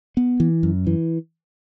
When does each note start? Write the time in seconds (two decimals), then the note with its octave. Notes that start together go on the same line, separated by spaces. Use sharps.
0.17 B3
0.40 E3
0.63 F#2
0.87 E3